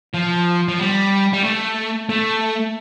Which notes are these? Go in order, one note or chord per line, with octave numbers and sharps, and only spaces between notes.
F3
F3
G3
G3
A3
A3